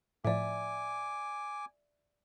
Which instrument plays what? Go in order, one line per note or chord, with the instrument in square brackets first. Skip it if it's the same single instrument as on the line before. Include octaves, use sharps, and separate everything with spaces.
[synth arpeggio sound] A2 F3 [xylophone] D5 E5 [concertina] G#5 D6